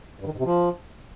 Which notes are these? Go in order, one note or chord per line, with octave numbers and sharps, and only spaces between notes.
G2
D#3
G#2
C3
F3